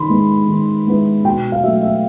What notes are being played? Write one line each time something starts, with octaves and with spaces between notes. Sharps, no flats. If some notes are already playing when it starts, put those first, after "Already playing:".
Already playing: D#3 B5 C6
G#3 B3 E4
D#3
G#3 B3 E4
B2 G5
F5
F#3 A3 E5
E5